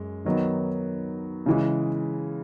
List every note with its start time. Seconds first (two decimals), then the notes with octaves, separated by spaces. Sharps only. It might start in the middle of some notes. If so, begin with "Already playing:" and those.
Already playing: F#2 G#3
0.25 D#3 F#3 B3 D#4
1.46 C#3 E3 G#3